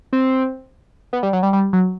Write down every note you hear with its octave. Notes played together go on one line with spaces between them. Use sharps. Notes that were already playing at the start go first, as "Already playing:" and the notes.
C4
B3
G3
F#3
G3
G3
F#3